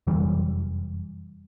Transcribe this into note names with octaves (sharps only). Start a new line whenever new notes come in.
F1 F#2 E3 G3